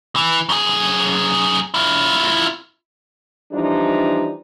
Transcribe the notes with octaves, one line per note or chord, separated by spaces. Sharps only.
E3
F#2 G#4
E4 F4
E3 F3 G3 D4 D#4